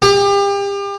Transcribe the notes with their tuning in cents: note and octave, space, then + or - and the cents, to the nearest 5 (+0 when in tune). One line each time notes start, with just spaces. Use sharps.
G4 +35